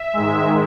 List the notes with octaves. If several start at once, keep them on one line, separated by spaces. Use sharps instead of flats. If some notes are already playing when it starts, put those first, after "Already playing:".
Already playing: E5
G#2 D#3 G#3